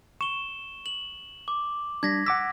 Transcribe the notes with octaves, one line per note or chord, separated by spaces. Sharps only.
C#6 E7 G7
F#7
D6
G3 D4 G#6 A#6 B6
F#5 D6 E6 B6